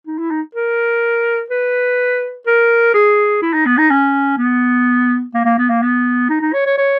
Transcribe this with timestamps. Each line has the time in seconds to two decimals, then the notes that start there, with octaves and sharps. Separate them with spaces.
0.07 D#4
0.18 E4
0.31 D#4
0.55 A#4
1.50 B4
2.47 A#4
2.94 G#4
3.42 E4
3.54 D#4
3.66 B3
3.77 D#4
3.90 C#4
4.38 B3
5.34 A#3
5.45 A#3
5.58 B3
5.69 A#3
5.82 B3
6.29 D#4
6.41 D#4
6.53 C#5
6.66 C#5
6.78 C#5